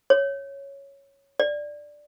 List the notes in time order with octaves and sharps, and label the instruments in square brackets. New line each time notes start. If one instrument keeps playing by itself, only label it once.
[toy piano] C#5
D5